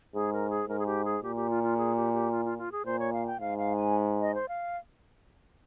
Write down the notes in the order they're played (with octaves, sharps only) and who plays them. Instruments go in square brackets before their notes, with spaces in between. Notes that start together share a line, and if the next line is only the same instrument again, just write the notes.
[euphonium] G#2 [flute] G#4
[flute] A#4
G#4
[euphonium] G#2 [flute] A#4
[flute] G#4
G4
G#4
[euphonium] A#2 [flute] G4
[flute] G4
F4
F4
G#4
G4
G4
F4
F4
F4
G#4
[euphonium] A#2 [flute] C5
[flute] C#5
F5
G5
[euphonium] G#2 [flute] F5
[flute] F5
G#5
D#5
C5
F5